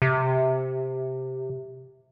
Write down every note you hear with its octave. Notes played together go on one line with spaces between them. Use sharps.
C3